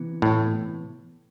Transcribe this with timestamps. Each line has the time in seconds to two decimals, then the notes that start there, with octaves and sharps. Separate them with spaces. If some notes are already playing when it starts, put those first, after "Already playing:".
Already playing: C3 E3 B3
0.22 A2